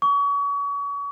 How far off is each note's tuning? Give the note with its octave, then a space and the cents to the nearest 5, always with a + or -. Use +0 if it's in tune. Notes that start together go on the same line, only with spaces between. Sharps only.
C#6 +35